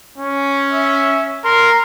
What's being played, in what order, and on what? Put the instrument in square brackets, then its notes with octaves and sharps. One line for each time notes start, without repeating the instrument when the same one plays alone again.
[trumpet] C#4
[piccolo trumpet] E5
[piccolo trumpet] A#4 [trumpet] C6